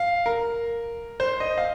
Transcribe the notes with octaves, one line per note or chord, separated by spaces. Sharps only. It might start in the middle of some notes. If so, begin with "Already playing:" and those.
Already playing: F5
A#4
C5
D#5
F5